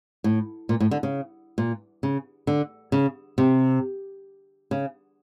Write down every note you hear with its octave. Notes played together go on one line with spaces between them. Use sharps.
A2
A#2
A2
D3
C#3
A#2
C#3
D3
C#3
C3
C#3